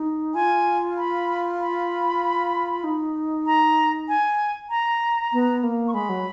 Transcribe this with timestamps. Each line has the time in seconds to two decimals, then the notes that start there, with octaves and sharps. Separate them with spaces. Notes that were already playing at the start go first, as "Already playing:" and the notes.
Already playing: D#4
0.35 F4 G#5
0.97 B5
1.60 B5
2.84 D#4
3.46 A#5
4.08 G#5
4.70 A#5
5.33 B3
5.64 A#3
5.88 C#6
5.94 G#3 B5
6.09 F#3